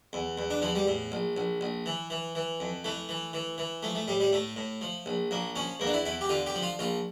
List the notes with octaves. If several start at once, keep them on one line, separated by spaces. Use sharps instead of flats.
E2
E2
D4
E2 F3
G3
A2
A#1
A#1
A#1
E3
E3
E3
F2
E3 A3
E3
E3
E3
F3 A3
A3
A2 G3
G3
A2 A3
A2
F3
A#1
A#1 A#3
F3 C#4
E2 A#3
D4
E4
E2 E4
G4
D3 F4
G4
F3
F4
A#1 F4